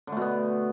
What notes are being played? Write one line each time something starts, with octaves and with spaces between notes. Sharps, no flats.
B2 D3 A3 B3